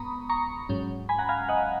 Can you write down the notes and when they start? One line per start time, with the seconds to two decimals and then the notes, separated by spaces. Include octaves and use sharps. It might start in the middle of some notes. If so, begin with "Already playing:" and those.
Already playing: G#2 B3 A#5 B5 C#6 D#6
0.29 A#5 C#6
0.69 G#2 F#3 C#4
1.09 G#5 B5
1.19 F#5 A#5
1.29 F5 G#5
1.49 D#5 F#5